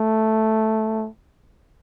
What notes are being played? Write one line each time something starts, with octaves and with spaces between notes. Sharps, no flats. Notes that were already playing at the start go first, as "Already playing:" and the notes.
Already playing: A3